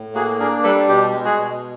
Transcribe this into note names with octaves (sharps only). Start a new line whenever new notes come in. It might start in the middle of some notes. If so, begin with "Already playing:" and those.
Already playing: A2
A#3 F#4 G#4
D4 G#4 A#4
G3 A4 B4
B2 G4
G#3
F#4 G#4
B2